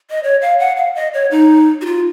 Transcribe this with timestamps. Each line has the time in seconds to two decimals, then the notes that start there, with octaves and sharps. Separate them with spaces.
0.10 D#5
0.23 C#5
0.42 F5
0.59 F#5
0.77 F5
0.95 D#5
1.14 C#5
1.31 D#4
1.81 F#4
1.86 F4